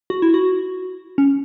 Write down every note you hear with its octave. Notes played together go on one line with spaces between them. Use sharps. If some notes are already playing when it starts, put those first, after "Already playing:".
F#4
E4
F#4
C#4